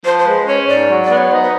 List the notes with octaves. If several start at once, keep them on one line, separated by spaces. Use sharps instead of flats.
F3 C5
C5
G#3 B4
C#4 C#5
G#2 D5
F#3
D5
B3
C#5
D#4 C5
B4